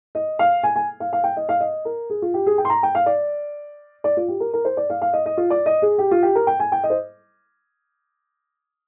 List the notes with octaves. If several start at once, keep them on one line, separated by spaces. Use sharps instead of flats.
D#5
F5
G#5
G#5
F5
F5
G5
D#5
F5
D#5
A#4
G#4
F4
G4
G#4
G5
C6
A#5
G5
F5
D5
D5
F4
G4
A#4
A#4
C5
D5
F5
F5
D#5
D#5
F4
D5
D#5
G#4
G4
F4
G4
A#4
G5
G#5
G5
D#5
C5